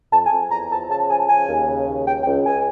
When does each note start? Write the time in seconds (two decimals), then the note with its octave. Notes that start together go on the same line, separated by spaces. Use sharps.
0.12 F2 A5
0.25 G#5
0.32 F2
0.50 E2 A#5
0.71 F3 A5
0.89 C#3 A5
0.99 A5
1.09 F3 G#5
1.19 A5
1.29 C#3 G#5
1.47 D#2
1.68 C#3
1.87 D#2
2.06 C#2 G5
2.20 G5
2.25 C#2
2.45 C#2 G#5